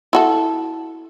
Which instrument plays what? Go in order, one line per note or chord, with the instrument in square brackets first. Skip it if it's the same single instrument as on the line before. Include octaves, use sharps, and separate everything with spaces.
[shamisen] E4 F#4 A4